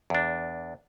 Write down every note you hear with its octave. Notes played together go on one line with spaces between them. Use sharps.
E2 D4